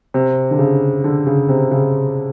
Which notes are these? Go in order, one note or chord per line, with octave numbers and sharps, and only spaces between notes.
C3
D3
C#3
D3
C#3
C3
C#3